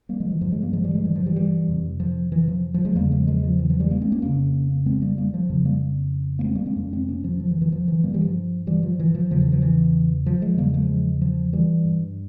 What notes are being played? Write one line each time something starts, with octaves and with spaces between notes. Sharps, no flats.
G3 A#3
F3 G#3
E3
G2 F3
F3 G#3
G3 A#3
F3 G#3
E3 G3
F3 G#3
E3 G3
F3
E3 G3
E3 G3
F2 C3
F3
E3
F3
F3
F3 G#3
E2 C#3 G3 A#3
F3 G#3
F3 G#3
F3
E3
F3
E3 G3
G3 A#3
G#3 C4
A#3 C#4
F2 C#3 A#3 C#4
G#3 C4
G3 A#3
G3 A#3
F3
F2 C#3 F3
G3 A#3
A#3
G#3 C4
G3 A#3
G#3 C4
F2 C3 A#3 C#4
G#3 C4
A#3 C#4
F3
F3
E3
E3
F3
E3
G2 G3 A#3
E3 G3
F3
E3 G3
F3
E3
F3
E2 C#3 F3
E3
F3
E3
F3
F3 G#3
E2 C#3 G3 A#3
F3 G#3
F3
E3 G3
G2